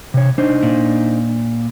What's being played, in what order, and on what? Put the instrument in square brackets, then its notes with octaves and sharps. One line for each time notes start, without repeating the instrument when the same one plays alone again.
[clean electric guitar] C3 C#5
D4 D#4 C5
[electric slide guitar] A#2